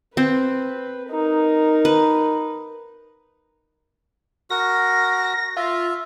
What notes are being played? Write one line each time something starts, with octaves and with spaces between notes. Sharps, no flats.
C4 B4
D#4 A#4
B4
F#4 A#4 A#6
F4 E5